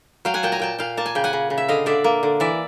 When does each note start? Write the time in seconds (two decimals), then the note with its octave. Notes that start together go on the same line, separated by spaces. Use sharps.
0.25 F#3 F5 G5
0.34 F#5 G#5
0.43 A#2 G5 A5
0.52 G#5 A#5
0.59 A#2 G5 A5
0.79 A#2 F5 G5
0.97 A#3 A5
1.06 G#5
1.15 C#3 G5
1.24 F#5 G#5
1.33 C#3
1.50 C#3
1.58 E5
1.68 D3 D#5 F5
1.86 D3 D5 E5
2.04 A#3
2.23 D3
2.40 E3 D5 E5